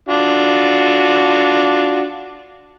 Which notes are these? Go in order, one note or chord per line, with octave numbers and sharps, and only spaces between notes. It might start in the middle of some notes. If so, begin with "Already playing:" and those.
D4 F4 F#4